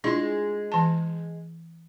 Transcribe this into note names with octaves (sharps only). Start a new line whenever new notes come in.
G#3 D4 E4 F4
E3 A5